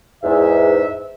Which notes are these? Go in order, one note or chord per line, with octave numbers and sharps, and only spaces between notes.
E2 G#2 E5